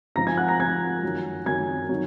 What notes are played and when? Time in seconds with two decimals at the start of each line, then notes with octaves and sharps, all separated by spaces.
0.15 G#2 F3 A#5 A#6
0.27 G#5 G#6
0.37 F#5 F#6
0.48 A#5 A#6
0.60 G#2 F3 G#5 G#6
1.03 F#2 D#3 F#3
1.46 F#2 D#3 F#3 G#5 G#6
1.89 D#3 F#3